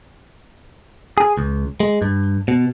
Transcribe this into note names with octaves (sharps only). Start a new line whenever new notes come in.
G#4
C#2
G#3
G2
B2